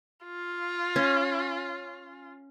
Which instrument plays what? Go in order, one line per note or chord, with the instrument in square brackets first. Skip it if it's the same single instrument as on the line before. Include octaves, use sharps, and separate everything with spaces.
[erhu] F4
[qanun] C#4